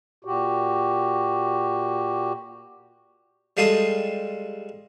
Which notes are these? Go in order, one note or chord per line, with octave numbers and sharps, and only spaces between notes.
A#2 F#4 G4
G3 G#3 F4 A4 C6 D#6